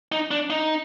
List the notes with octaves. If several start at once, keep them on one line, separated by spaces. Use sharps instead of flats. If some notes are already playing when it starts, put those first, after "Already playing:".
D#4
D4
D#4